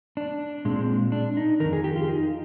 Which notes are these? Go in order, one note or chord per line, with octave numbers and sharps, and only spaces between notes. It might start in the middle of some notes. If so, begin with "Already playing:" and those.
D4
A#2 G#3 C4
D4
D#4
F2 C3 D#3 A#4
G#4
G4
F4
D#4